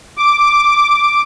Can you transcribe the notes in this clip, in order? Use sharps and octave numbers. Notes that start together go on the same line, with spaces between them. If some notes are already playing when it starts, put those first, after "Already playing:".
D6